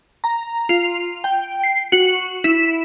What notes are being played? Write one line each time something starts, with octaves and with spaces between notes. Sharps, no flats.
A#5
F4
G5
C7
F#4
E4